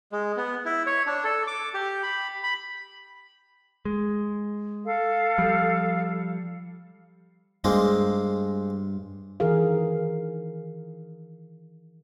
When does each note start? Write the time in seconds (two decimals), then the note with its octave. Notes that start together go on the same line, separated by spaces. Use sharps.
0.12 G#3
0.37 B3
0.65 E4
0.87 C#5
1.07 D4
1.24 A4
1.47 D6
1.74 G4
2.03 B5
2.43 B5
3.85 G#3
4.84 A4 F5
5.38 F3 G3
7.64 G2 G#3 A#3 C4
9.40 D#3 E3 G#4 A#4 F5